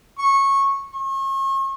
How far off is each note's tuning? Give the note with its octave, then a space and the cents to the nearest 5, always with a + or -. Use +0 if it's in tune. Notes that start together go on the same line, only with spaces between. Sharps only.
C#6 -15
C#6 -40